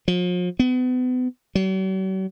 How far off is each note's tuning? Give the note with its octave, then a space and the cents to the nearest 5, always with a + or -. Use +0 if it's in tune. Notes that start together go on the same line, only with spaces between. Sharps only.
F3 +40
B3 +35
F#3 +45